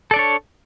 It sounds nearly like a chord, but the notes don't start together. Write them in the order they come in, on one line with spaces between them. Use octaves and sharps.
A4 D5 D4 C#5